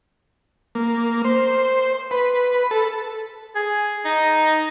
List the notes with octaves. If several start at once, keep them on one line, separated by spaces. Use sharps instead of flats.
A#3
C5
B4
A4
G#4
D#4